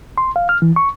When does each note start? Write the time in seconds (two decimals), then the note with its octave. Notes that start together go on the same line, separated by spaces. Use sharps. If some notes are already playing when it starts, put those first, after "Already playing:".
0.18 C6
0.36 F5
0.49 F6
0.62 E3
0.76 C#6